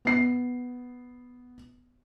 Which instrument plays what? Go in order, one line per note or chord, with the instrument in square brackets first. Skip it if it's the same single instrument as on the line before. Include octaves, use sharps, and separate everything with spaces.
[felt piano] B3 C7